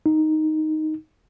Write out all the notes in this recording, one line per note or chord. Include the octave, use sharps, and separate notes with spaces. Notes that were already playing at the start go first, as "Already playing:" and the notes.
D#4